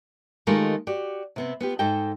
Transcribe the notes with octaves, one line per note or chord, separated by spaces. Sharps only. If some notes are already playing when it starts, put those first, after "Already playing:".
D#3 G#3 A3 F4 G4 A#4
F#4 G4 D5
C3 B3 C4
B3 F4 G4
G#2 A4 D#5 G5 A5